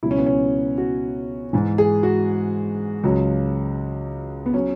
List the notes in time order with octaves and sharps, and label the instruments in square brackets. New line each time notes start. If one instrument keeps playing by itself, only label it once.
[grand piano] C#2 B2 F#3 E4
C#4
B3
C#4
F#4
G#2 E3
G#4
F#4
C#2 C#3 F#3
B3
F#3 C#4